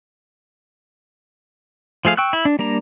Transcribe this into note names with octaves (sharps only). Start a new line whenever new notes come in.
F3 A3 G#4 F5
G5 C#6 E6 F#6
E4
D4
G3 A#3 D4 A#5